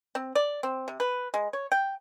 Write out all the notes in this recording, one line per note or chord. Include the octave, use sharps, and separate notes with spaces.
C4
D5
C4
C3
B4
G#3
C#5
G5